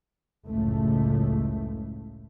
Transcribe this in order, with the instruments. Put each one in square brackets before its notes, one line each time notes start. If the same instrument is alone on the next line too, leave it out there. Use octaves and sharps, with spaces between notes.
[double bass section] F#1 C#2 A2 A3